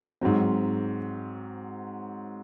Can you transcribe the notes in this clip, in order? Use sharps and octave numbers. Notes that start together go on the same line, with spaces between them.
G#2 F#3 C4